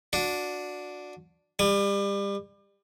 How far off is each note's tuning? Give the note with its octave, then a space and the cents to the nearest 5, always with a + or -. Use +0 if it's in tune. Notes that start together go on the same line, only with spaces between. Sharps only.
D4 +0 F#4 -25
G3 +30 G#5 -35